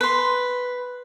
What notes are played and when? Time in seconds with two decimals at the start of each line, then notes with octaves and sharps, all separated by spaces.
0.01 B4 C6